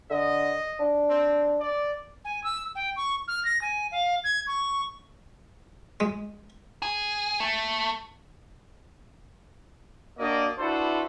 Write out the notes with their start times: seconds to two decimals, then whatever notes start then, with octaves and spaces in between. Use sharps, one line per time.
0.10 D3 D#5
0.79 D4
1.09 C4
1.60 D5
2.25 G#5
2.44 E6
2.75 G5
2.96 C#6
3.28 F6
3.45 A#6
3.62 G#5
3.92 F5
4.24 G#6
4.47 C#6
6.00 G#3
6.82 G#4
7.40 A3
10.19 A#3 D4 F#4 D5 D#5
10.59 D4 E4 F#4 A4 B4 C5